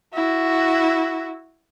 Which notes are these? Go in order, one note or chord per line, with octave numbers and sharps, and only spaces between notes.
E4 F#4